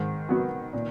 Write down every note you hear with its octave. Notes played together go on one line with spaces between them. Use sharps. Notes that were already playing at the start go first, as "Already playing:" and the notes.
Already playing: G#2 D#3
F#3 B3 F#4
A#2